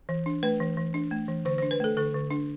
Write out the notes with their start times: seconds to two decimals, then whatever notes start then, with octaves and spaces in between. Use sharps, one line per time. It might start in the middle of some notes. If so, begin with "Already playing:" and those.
0.09 E3
0.26 D4
0.43 A3 B4
0.60 E3
0.77 E3
0.94 D4
1.11 A3
1.28 E3
1.45 D3 C5
1.58 D4 C5
1.71 B4
1.80 A3 A4
1.97 D3 A4
2.14 D3
2.31 D4